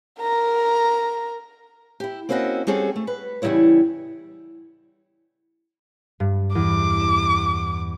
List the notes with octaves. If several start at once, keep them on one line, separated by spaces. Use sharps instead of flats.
A#4 A#5
E4 G4
A#3 C4 C#4 E4 F#4 D#5
G3 C4 C#4 F#4 G#4 A4
A3
B4
E2 C#3 F3 G3 E4 C#5
G2
E2 D6
E7